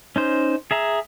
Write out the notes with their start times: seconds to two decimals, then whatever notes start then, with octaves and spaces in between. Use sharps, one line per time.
0.16 C#4 D#4 C5
0.71 G#4 E5 A#5